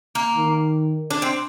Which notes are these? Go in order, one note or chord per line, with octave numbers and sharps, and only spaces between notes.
A#3
D#3
D4
C4